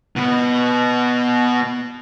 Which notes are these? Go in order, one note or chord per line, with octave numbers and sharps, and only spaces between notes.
B2 B3